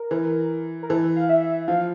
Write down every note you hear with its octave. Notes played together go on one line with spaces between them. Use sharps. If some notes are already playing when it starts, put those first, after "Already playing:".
Already playing: A#4
E3
A#4
E3 A4
F5
E5
F3 F5